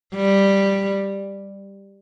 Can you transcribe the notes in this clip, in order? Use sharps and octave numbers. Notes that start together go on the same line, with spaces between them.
G3